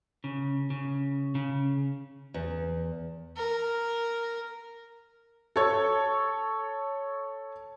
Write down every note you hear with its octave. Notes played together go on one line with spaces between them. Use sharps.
C#3
C#3
C#3
E2
A#4
A4 C#5